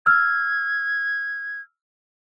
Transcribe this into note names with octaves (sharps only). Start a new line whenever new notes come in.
E6 F6 G#6